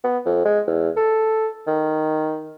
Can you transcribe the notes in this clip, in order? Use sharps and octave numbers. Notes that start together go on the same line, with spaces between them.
B3
F2
G#3
E2
A4
D#3